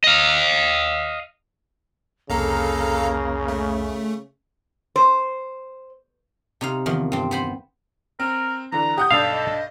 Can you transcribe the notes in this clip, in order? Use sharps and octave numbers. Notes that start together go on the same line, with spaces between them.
D#5 F5
C2 F2 C#3 A#3 A4 F5 A#5
A3
C5
C3 D#4 F5
E2 D#3 F3
G2 C4
B3 C5 B5
C4 A#4
D3 E3 A#5
G4 F#5 D#6 G6
B1 G2 D4 A4 F5
D#5